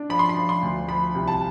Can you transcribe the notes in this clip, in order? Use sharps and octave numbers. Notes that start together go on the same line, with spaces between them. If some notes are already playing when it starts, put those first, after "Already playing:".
Already playing: D4
F3 B5
C6
B5
F3
C6
D2
F3 B5
C2
A5